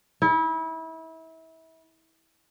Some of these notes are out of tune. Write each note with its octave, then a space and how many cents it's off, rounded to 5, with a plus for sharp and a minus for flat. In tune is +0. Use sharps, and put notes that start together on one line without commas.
E4 -30